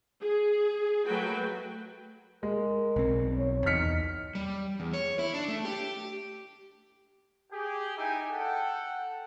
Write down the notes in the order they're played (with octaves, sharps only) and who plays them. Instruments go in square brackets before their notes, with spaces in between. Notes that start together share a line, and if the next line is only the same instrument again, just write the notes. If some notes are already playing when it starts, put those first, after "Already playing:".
[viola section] G#4
F#3 A3 A#3 F#4 B4 G5
[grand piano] G#3 [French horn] A#4
[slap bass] B1 C4
[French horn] C#5
[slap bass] E2 [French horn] D#4 [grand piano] F6 B6 C#7
[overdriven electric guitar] G3
E2
C#5
E4
D4
A3
G4
[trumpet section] G4 G#4
D#4 E4 G5 G#5
A4 F#5 G5